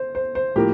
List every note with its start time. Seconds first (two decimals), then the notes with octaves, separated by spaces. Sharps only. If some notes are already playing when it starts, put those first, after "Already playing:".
Already playing: C5
0.15 C5
0.35 C5
0.56 A2 F3 A#3 G4